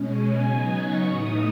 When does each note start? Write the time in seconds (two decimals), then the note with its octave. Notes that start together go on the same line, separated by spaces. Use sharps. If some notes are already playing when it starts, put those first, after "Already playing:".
Already playing: B2 G#3 C#4
0.10 G#5
0.41 C#3 F#3 B3 D#4
0.73 C#6
1.05 A2 E3 A3 D#4 D#6